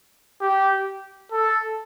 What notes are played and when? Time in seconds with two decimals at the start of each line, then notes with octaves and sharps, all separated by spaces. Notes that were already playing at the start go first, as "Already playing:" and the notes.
0.41 G4
1.32 A4